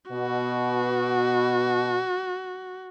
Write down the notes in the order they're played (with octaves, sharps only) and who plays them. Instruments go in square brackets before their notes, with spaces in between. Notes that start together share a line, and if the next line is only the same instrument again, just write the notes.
[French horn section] B2 [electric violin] F#4